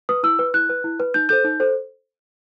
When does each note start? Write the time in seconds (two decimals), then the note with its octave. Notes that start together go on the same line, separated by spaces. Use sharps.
0.09 B4 D#6
0.23 E4 E6
0.39 B4
0.54 E4 F#6
0.69 B4
0.84 E4
1.00 B4
1.14 D#4 G6
1.29 A4 C5 G6
1.45 D#4
1.60 A4 C5